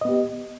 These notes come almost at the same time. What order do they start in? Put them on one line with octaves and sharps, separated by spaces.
D#5 B3 G4